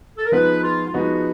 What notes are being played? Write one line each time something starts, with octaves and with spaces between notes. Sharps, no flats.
A4
A#4
F3 G#3 B3 D#4 B4
F4
F4
F3 G#3 B3 D#4 F#4